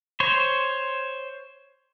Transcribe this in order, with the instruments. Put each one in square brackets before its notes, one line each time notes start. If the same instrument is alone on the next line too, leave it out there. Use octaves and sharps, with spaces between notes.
[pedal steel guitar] C5 C#5